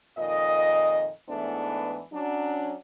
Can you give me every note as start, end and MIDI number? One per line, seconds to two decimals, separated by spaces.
0.18 1.08 41
0.18 1.08 46
0.18 1.08 51
0.18 1.08 75
1.29 2.01 40
1.29 2.01 44
1.29 2.01 52
1.29 2.01 57
1.29 2.01 59
1.29 2.01 62
2.13 2.74 54
2.13 2.74 61
2.13 2.74 62